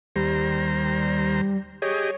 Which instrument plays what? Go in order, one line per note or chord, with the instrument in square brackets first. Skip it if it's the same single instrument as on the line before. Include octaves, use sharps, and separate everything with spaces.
[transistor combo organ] D#2 C5 A#5 [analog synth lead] G3
[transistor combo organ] G4 G#4 D#5 [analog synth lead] C#5